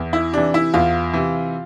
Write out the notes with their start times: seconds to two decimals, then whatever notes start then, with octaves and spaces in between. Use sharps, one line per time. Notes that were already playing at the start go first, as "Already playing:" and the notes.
Already playing: E2
0.13 E4
0.33 C3 E3 D4
0.54 E4
0.74 E2 F4
1.13 C3 E3